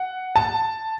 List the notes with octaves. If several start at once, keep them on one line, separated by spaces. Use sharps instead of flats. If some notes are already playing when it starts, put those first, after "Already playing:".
Already playing: F#5
A5